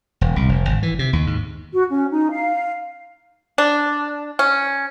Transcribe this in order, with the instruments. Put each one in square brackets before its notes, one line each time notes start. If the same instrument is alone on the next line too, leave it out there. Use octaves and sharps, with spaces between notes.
[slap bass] E1
C2
F1
G#1
E3
C3
D#2
G#2
[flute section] F#4
C#4
D#4
F5
[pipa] D4
C#4